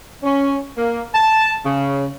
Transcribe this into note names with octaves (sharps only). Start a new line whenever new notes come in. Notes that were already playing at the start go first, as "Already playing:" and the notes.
C#4
A#3
A5
C#3